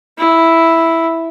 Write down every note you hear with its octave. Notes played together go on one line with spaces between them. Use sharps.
E4